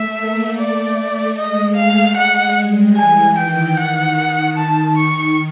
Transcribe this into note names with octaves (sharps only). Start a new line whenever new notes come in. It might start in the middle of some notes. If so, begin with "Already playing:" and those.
Already playing: A3 E5
A#3
A3 D5
G#3 D#5
A3 F5
G#3 F#5
G3
E3 G#5
D#3 G5
F#5
D#3
A5
C#6